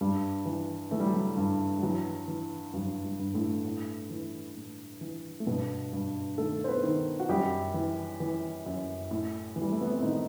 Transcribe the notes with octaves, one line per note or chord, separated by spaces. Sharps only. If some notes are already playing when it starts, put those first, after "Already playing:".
G2 G3
E3
E3 A3
G3
F#3
G3
G2
G3
E3 F#3
E3
G2 F#3
G3
G2
A2 A3
A2
E3
A2
E3
A3
G2 B2 B3
G2
D#3 A3 A4
C5
B3 B4
D#3
F#4
F#2 G3 G4
E3
E3
F#2
A2
E3
G3
A3
B3
C4
A2 D#3 D#4